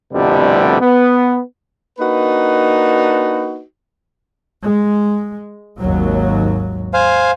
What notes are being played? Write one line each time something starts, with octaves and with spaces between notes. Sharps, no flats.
C2 F2 B2 D3 G3 A3
B3
A#3 D4 D#4 F#4 B4
G#3
G#1 D#2 F#3
C5 F5 G#5